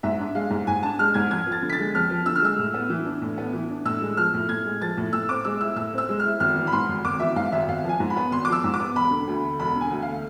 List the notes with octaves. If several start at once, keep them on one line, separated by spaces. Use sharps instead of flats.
G#2 E5
D4
G#3 F5
G#2
G#2 G#5
D4 A5
G#3 F6
G#2 G#6
F2 G#6
F3
A6
D3
B6
A6
G#3
F2 F6
F3
D3 E6
F6
G#3 E6
A2
B3
E3
D4
A2
B3
E3
D4
A2 E6
G#3
F3 F6
A2
A2 G#6
G#3
F3 A6
A2
A2 E6
C4 D6
G#3 E6
E4 E6
A2 E6
C4 E6
G#3
F6
E4
G#1 F6
E3
B5
G#2 C6
G#1
G#1 D6
E3 E5
G#2 F5
G#1 E5
G#1 F5
F3
G#5
G#2
B5
B3
G#1 C6
D6
F3 E6
G#2
D6
B3
E1 B5
D3
D2
A3
E1 B5
D3
G#5
D2
F5
A3